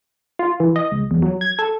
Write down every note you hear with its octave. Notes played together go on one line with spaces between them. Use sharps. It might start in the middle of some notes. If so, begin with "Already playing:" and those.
F4
E3
D#5
C#2
E2
F#3
G#6
A4